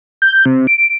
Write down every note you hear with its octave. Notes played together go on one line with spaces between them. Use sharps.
G6
C3
D7